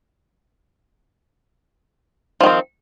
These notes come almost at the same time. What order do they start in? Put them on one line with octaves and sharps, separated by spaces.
F3 D#3 C4